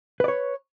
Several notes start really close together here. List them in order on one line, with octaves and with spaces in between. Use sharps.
B4 D5 C#5